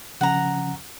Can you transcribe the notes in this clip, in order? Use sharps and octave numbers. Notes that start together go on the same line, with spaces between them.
C#3 F3 C#4 F#5 A#5